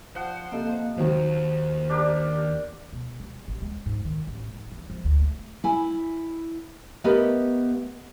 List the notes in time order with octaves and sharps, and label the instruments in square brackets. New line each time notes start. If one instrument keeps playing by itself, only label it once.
[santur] F3 F#5 [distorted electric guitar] C5
[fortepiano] C3 A4 [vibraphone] A#3 D#5 F5
[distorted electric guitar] D#2 [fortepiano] D#3 F#3 [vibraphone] C5
[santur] D4 G4 A#4
[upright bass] B2
G3
A1
G#3
G#2
D#3
A1
G#2
E3
F3
D2
A3
[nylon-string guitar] E4 G#5
A3 B3 G4 A#4 B4 D#5